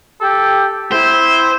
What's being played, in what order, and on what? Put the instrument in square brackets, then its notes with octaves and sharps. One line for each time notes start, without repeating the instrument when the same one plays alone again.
[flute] G4 [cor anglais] A4
[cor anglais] C4 [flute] E4 [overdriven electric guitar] C5